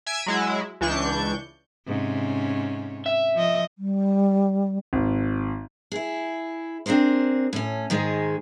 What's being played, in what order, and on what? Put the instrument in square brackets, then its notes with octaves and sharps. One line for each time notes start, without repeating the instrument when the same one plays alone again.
[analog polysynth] E5 G#5 E6 G#6 D7 E7
F#3 G#3 E4
C#2 E3 D4 C#6 G6
[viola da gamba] G#2 C3 C#4
[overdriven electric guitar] E5
[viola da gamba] F3 D#5
[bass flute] G3
[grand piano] G#1
[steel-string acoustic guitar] E4 G#4
C4 D4 G#4 A#4 C5
A2 C#4
G#2 D#3 G#3 G#4